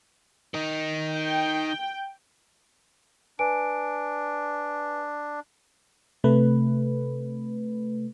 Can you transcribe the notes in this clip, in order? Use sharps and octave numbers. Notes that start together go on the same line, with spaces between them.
D#3 D#4
G5
D4 B4 G#5 D7
C3 A3 B4